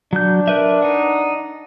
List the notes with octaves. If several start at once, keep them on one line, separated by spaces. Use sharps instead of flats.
F#3 D4 G6
A#4 B4 E5
D#4 F#5